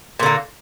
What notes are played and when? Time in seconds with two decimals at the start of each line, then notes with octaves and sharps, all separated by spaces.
0.19 A#2
0.23 D3
0.26 A#3